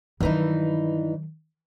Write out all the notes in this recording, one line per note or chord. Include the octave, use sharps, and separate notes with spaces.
G2 D#3 E3 F#3 D#4